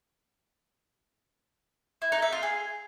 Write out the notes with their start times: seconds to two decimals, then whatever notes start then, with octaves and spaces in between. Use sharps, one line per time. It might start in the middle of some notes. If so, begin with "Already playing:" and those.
2.02 E4
2.12 D#4
2.22 E5
2.32 F4
2.43 G#4